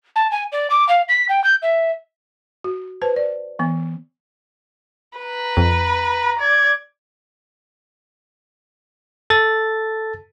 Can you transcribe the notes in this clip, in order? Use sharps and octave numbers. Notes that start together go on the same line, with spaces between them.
A5
G#5
D5
D6
F5
B6
G5
G6
E5
F#4
B4 C5 A5
D5
E3 B3
B4 A#5
F2
D5 G#6
A4 A6